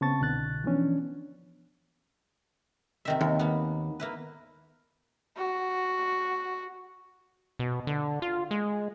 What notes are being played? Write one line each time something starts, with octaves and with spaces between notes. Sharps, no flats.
C#3 B3 C4 A5 C#6 A6
C2 B2 D3 F#6 A6
E3 F3 B3 C#4 D4
C3 D#3 E5
D#2
A#3 B3
A#3 E4 B4
F#4
B2
D3
F4
G#3